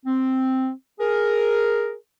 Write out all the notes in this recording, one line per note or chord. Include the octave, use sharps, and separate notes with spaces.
C4
G#4 A#4